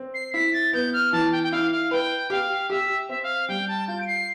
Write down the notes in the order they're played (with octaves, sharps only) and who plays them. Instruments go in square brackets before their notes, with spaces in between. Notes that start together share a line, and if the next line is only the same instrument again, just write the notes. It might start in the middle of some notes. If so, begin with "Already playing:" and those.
Already playing: [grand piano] C4
[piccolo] C7
[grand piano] E4 [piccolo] B6
[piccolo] A6
[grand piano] B3 [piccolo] G6
[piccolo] F6
[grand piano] E3 [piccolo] A5
[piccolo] G5
G5
[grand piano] E4 [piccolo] F5
[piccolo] F5
[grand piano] B4 [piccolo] G5
[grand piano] G4 [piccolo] F5
[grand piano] G4 [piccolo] E5
[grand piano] C4 [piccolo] E5
[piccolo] F5
[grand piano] G3 [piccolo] G5
[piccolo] A5
[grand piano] F4 [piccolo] G6
[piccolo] D7
C7